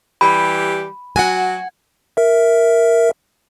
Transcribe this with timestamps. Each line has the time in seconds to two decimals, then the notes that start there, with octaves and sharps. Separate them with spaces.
0.21 E3 G3 G4 B5
1.16 F#3 F#4 F#5 G#5
2.17 A#4 E5